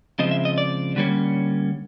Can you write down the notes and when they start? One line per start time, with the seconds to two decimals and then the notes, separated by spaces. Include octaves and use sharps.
0.19 C#3 F3 G#3 C4 D#5
0.31 E5
0.45 D#5
0.58 D5
0.96 D3 G3 A#3 C#4